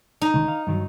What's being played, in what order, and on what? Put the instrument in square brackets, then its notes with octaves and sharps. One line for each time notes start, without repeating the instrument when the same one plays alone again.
[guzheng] D#4
[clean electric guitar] C#2 D#3
F5
G2 D#3 F#3